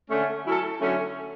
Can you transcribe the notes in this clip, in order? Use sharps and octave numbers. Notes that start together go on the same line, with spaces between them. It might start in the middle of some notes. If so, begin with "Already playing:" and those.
D3 A3 C#4
F#3 C#4 E4 A4
D3 F#3 A3 C#4